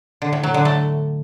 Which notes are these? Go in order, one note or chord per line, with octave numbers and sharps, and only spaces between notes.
D3
A2
F#3
D3
A3